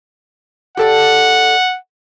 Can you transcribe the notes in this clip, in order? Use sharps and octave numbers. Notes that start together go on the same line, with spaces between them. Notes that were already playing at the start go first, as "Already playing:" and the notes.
G4 A4 D5 F#5